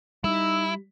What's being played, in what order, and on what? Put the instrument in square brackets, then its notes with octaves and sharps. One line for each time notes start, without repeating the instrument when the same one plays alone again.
[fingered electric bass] G3 [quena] D#4 [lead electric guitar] E4 [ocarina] E6